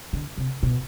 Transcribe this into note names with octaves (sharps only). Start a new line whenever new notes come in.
D3
C3
B2